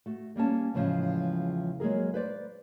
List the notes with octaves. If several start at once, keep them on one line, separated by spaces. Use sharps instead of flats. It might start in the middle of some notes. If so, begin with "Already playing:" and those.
A3 F#4
G3 A#3 C#4 A5
E2 A2 C#3 E3 F3 G#3
F#3 G#3 A#3 G#4 A#4
B4 C5 D5